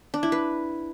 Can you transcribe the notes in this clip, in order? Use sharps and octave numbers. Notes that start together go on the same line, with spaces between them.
D4
E4
B4